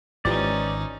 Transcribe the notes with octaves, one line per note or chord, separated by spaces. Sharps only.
G#1 G#2 E3 F3 C#4 D#4 G4 D5